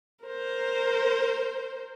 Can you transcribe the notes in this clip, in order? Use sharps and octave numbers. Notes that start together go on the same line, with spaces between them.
A#4 C5